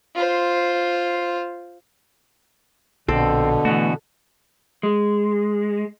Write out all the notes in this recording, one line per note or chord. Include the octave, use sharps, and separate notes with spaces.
F4 C5
A#1 B2 D3 C4 A4
E3 A3 B3 F#4
G#3